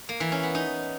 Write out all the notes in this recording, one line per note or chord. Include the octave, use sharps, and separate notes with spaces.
A#3
E3
C#4
B3
D#4